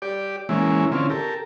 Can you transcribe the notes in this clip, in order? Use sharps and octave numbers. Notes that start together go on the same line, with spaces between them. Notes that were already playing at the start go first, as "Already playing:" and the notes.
G4 D5
E3 G#3 A#3 C#4 E4
D3 C4 C#4 E4 F4
G4 A4 A#4